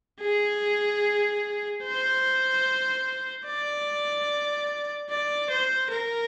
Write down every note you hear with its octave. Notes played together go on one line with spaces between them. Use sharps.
G#4
C5
D5
D5
C5
A#4